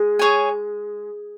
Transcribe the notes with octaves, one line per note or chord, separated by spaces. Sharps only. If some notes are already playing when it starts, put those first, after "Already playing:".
Already playing: G#3
G#4 C#5 G#5